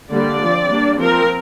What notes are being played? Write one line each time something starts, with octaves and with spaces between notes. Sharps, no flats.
D3 G3 A#3 D5
F3 C4
G3 A#3 D4
F3 C4 A#4